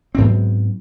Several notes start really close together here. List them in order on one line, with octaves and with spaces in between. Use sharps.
C4 G#2 B3 F#3